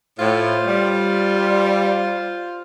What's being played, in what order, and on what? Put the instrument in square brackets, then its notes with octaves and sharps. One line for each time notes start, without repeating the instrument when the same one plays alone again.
[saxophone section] A2 [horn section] F4 C5
[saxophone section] G3